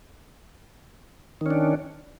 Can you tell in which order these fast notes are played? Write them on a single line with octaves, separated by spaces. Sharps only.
D#3 C#4 D4